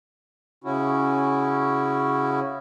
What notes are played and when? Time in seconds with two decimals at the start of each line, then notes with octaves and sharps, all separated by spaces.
0.64 C#3 C#4 E4 F#4